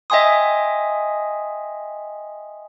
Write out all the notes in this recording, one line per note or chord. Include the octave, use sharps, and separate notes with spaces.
D#5 E5 G5 G#5 C6 D#6